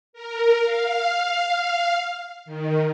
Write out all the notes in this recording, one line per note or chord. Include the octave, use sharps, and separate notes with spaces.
A#4
F5
D#3